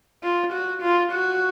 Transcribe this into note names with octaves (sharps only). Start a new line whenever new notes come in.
F4
F#4
F4
F#4